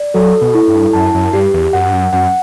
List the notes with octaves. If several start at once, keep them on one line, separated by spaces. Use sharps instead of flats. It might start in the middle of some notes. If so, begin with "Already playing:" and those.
Already playing: D5
F#3 A4
B2
E4
G2
F#2 A5
F#2
G2 G4
E2
F#2 F#5
G2
F#2
F#2 F#5